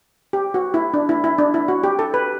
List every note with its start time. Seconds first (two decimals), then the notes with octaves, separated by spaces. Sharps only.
0.33 G4
0.54 F#4
0.74 E4
0.94 D4
1.09 E4
1.24 E4
1.38 D4
1.54 E4
1.68 F#4
1.84 G4
1.99 A4
2.14 B4